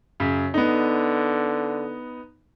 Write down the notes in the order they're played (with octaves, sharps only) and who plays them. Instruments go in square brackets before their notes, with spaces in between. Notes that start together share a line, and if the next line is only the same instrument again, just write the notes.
[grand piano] F#2 C#3
[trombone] D3 [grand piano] B3 D#4